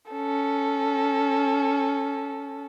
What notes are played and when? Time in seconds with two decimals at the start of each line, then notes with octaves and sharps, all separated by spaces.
0.11 C#4 A4